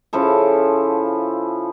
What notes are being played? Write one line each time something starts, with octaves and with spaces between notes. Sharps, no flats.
C#3 F3 E4 A4